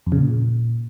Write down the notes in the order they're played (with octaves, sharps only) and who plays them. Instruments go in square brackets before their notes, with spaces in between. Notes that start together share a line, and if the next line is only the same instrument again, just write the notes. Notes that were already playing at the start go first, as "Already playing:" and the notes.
[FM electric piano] F2
C#3
A#2